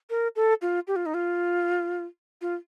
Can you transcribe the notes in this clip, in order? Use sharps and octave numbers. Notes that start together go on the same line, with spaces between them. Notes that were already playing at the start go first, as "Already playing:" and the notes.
A#4
A4
F4
G4
F4
D#4
F4
F4